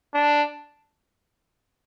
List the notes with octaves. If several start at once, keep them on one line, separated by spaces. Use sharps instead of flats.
D4